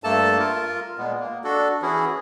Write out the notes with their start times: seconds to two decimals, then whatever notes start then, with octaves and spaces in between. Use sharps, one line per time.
0.04 G2 A3 A#3 A4 A5
0.39 F4 A#4
0.98 A#2 G#3 B3
1.20 A#3
1.44 D4 F#4 A4
1.82 E3 C#4 E4 F#4 G#4